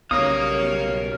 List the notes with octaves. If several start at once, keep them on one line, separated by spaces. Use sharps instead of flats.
B1 C#3 G3 A#4 C#5 F5 D#6